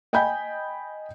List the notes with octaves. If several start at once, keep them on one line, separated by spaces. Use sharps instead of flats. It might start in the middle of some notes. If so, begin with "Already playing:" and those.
D#5 G5 G#5 B5 G6